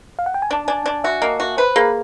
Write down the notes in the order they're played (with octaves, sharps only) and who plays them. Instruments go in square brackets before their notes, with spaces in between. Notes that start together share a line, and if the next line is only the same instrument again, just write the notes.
[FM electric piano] F5
F#5
G5
G#5
[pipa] D4 [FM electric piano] A5
[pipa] D4 [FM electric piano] G#5
[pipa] D4
[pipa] F#4 [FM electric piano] E5
[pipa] A#3 [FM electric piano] D#5
[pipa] F#4
[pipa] B4 [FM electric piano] C5
[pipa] A#3 [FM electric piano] G#4